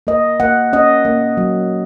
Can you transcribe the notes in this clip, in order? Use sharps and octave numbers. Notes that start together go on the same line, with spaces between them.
A#3 D#5
A#3 F#5
C#4 D#5
A#3
F#3